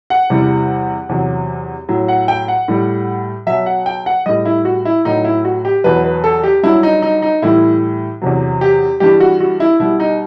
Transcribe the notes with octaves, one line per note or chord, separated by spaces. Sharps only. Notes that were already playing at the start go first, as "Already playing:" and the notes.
F#5
E2 C3 E3 G3
E2 C3 F#3
A2 F#3
F#5
G5
F#5
A2 G3
B2 F#3 E5
F#5
G5
F#5
A2 G3 D#5
E4
F#4
E4
A2 F#3 D#4
E4
F#4
G4
E2 B2 F#3 B4
B4
A4
G4
G2 F#3 E4
D#4
D#4
D#4
A2 E3 G3 E4
E2 C3 F#3
G4
G2 E3 G3 G4
F#4
F#4
E4
B2 G3 E4
D#4